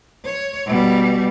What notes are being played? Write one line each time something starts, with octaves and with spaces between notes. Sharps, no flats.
C#5
B2 G3